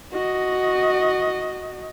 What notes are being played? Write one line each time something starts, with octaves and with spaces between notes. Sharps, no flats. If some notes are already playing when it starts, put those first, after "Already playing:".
F#4 D#5